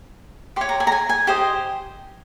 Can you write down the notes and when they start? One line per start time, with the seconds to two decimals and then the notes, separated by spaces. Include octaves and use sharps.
0.56 G4 C6
0.61 C#5
0.69 A#5
0.80 G#5
0.87 A#5
0.92 G#5
1.09 G#5
1.27 G4 C5 D#5